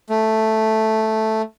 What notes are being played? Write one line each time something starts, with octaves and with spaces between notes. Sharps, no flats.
A3